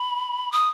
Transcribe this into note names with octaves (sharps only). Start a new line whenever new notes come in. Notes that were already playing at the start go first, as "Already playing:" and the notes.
Already playing: B5
D#6